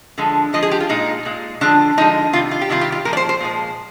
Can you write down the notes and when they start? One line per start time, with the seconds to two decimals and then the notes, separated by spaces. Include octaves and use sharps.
0.18 D3 F3 G#3
0.53 D3 F3 G#3 D#5
0.63 G#4
0.71 G4
0.80 F4
0.89 A#2 G#3 D#4
1.25 A#2 G#3
1.61 D3 F3 G#3 D4
1.97 D3 F3 G#3 D#4
2.33 C3 D#3 G3 F4
2.51 F4
2.61 G4
2.69 C3 D#3 G3 F4
2.81 G4
2.92 F4
3.05 A#2 F3 G#3 A#4
3.13 D5
3.17 C5
3.29 C5
3.40 A#2 F3 G#3